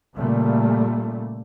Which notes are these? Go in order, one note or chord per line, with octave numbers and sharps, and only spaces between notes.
A#2 C#3 G3 A3